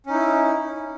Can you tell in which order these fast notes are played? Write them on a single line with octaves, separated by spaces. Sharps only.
C#4 D#4 E4